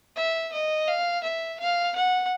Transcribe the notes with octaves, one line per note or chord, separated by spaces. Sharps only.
E5
D#5
F5
E5
F5
F#5